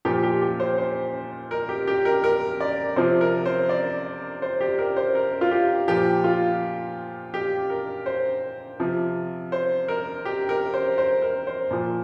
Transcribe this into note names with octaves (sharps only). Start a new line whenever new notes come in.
A#2 F3 G4
G4
G4
C5
C5
A#4
G4
G4
A#4
A#4
D5
C3 F3 C5
A#4
C5
D5
C5
G4
A#4
C5
A#4
F4
G4
A#2 F3 G4
F4
G4
A#4
C5
C3 F3
C5
A#4
G4
A#4
C5
C5
A#4
C5
A#2 F3